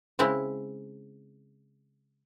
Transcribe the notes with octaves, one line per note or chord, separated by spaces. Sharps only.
C#3 G#3 C4 E4